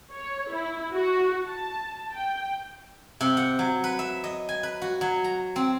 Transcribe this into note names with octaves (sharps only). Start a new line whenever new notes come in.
C#5
E4
F#4
A5
G5
C3
F#5
F#3
B4
E5
D#5
G#5
B4
F#4
F#3
A#5
C4